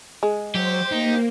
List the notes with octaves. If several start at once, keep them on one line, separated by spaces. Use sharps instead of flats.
G#3
F#3 G4 C5
A#3 D#4